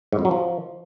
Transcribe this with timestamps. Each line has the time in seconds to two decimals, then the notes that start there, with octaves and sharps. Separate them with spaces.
0.12 G#2
0.19 F2
0.25 F#3
0.31 F3